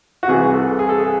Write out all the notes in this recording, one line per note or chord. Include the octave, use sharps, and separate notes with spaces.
F#4
C2 C3 E3 G#4
A4
G#4
A4
G#4